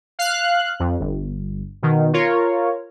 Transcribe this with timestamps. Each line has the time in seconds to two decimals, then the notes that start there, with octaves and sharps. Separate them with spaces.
0.19 F5 F#6
0.80 F2
1.00 G1
1.82 B2 D#3
2.13 F4 A#4 C#5